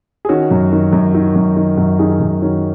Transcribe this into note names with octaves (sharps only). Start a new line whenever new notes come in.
G#4
D#3 C#4 F#4
F#2
D#3
F#2
D#3
F#2
D#3
F#2
D#3 D#4 G#4
F#2
D#3 C#4 F#4